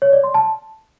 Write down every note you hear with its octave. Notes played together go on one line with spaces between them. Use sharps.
C#5
D5
C6
A5